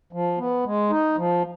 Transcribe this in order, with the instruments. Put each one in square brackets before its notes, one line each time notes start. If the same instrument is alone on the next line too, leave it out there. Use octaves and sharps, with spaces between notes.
[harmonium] F3
B3
G#3
D#4
F3